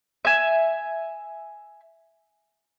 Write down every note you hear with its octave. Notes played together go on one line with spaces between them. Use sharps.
E5 G#5